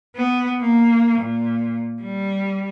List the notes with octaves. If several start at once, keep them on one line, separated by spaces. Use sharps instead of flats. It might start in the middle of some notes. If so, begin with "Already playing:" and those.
B3
A#3
A#2
G3